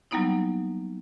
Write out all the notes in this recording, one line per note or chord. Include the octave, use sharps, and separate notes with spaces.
F#3 G3 A#3 B3 D#4 E4